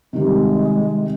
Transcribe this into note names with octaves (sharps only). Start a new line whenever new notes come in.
C3 D#3 G3 G#3 C4